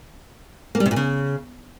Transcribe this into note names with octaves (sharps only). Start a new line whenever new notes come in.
A#3
G3
C3
A#2
C#3